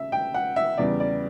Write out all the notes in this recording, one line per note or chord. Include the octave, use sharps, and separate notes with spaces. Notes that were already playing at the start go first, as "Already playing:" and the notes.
Already playing: C#3 E5
G5
F#5
E5
E2 C#3 G3 D5
D5